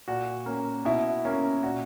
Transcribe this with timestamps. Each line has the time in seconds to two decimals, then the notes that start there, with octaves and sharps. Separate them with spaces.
0.08 A#2 F#4
0.46 A#3 C#4
0.85 B2 E4
1.25 A#3 C#4
1.63 A#2 F#4